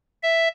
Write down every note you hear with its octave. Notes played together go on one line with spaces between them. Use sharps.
E5